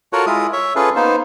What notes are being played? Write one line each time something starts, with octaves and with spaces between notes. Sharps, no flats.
F4 F#4 A4 A#4 C#5 F#5
G#3 E4 F4 D#6
C#5 E5
C#4 F4 G#4 A4 B4
A#3 B3 D#4 C5